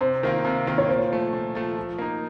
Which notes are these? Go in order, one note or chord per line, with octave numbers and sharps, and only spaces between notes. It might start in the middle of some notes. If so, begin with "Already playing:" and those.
C3 C5
D#3 A#3 F4
C3
D#3 A#3 F4
C#5
A#2 C5
F3 A3
A#2
F3 A3
F3
A#3 D#4